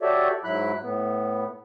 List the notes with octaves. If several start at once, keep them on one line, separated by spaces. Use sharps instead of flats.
F#4 G4 A4 C#5 D5 E5
G#2 F#3 E4 B5 F#6
A2 B3